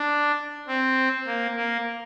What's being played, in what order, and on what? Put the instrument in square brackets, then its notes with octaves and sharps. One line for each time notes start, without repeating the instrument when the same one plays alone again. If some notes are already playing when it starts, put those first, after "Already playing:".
Already playing: [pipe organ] D4
C4
A#3
A#3